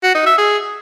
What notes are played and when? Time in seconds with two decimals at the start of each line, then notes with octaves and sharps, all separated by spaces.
0.03 F#4
0.14 D#4
0.26 E5
0.38 G#4